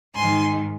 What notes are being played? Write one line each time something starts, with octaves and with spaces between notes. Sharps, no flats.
G#2 D#3 G#5 C6